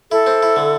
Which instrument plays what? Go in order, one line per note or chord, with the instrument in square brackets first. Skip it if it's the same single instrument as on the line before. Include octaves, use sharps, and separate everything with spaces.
[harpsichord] E4 [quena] A4
[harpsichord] C4
E4
D3